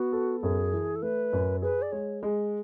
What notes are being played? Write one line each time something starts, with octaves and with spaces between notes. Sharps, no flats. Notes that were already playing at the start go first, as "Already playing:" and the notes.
Already playing: B3 F#4
A4
F#2 G#4
E3
A4
A3 B4
F#2
G#4 B4
D5
G#3 C#5
G#3